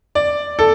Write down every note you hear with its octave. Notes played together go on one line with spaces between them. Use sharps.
D5
A4